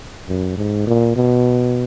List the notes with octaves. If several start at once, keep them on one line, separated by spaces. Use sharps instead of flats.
F#2
G#2
A#2
B2